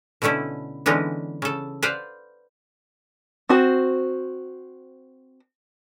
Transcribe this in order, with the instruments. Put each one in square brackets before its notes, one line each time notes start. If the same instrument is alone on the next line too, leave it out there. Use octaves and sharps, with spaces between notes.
[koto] B2 D3 A3 C#4 E4
D3 E3 G#3 B3 C#4 D#4
C#3 A4
B4 C5 D5 F5 F#5
[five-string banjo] C4 F#4 C5